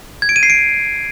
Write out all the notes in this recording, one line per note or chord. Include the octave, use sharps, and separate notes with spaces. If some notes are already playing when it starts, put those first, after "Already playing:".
G#6
D7
D#7
C7
D7